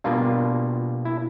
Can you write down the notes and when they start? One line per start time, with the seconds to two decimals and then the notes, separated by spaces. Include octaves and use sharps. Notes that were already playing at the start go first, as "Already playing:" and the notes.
0.04 B2 G3 A#3 D4 F4
1.05 E4